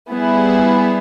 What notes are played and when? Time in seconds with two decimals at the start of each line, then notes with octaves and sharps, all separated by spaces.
0.11 G3 B3 E4 G#4